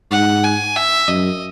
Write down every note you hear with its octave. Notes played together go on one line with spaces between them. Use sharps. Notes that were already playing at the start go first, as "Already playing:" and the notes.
G#2 F#5
G#5
E5
F#2 D#5